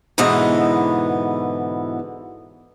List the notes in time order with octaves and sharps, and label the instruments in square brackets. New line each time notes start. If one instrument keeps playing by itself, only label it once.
[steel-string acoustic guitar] G#2 B2 D3 E3 B3 D#5